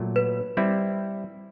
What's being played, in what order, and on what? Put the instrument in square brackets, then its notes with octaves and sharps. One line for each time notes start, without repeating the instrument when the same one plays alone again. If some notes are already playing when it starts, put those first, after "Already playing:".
Already playing: [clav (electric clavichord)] A#2 F#3 A3
[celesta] B4
[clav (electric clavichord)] G3 C4 E4